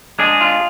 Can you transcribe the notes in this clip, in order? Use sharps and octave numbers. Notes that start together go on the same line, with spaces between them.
G#3 D4 G#4
F4